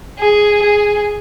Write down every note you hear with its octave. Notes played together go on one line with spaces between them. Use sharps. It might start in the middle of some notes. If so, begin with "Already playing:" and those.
G#4
G#4